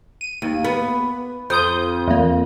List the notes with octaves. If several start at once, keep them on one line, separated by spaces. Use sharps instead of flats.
D#7
D#2
B3
F2 C5 D#6 G6
E2 A#3